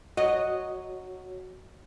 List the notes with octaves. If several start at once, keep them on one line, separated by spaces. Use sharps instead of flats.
F#4 C#5 D#5